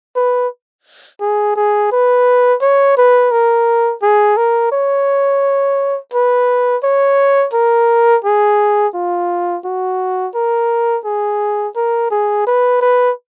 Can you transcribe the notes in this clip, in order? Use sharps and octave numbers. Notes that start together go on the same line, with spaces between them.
B4
G#4
G#4
B4
C#5
B4
A#4
G#4
A#4
C#5
B4
C#5
A#4
G#4
F4
F#4
A#4
G#4
A#4
G#4
B4
B4